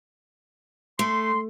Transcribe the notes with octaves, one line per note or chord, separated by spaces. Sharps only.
A3 C6